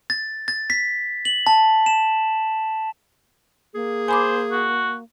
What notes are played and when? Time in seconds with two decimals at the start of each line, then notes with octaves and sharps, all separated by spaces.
0.10 A6
0.48 A6
0.70 B6
1.25 F#7
1.47 A5
1.86 E7
3.75 A#3 G#4
4.08 C5 G#5 B5 D6
4.52 F#4